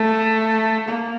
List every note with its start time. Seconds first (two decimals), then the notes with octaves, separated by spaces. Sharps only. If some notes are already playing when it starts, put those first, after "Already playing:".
Already playing: A3
0.88 A#3